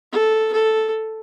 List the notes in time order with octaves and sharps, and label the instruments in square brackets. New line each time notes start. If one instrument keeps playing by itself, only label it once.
[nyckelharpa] A4
A4